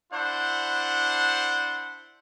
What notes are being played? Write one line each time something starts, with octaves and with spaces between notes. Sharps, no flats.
D4 E4 C5 F#5